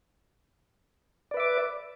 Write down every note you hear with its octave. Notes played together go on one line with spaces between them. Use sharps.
B4 D5 E5 D6